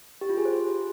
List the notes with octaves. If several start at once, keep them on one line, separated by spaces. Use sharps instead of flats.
G4
F4
G#4
C5